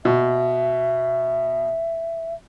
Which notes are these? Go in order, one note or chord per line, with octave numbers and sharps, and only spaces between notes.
B2 E5